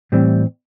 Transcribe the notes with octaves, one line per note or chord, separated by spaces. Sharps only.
A2 E3 G3 C4